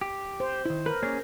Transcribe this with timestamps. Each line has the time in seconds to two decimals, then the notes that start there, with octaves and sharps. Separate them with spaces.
0.01 G4
0.40 C5
0.65 D#3 E4
0.86 A#4 B4
1.03 A#3 C#4 G#4 C#5 D5